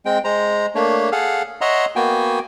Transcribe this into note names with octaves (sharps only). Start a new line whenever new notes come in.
G#3 C4 G5
G#3 C5 A#5
A3 A#3 D4 C#5
G#4 A4 F5 F#5
C#5 D#5 E5 F#5 A#5 C6
A#3 B3 F#4 G5 G#5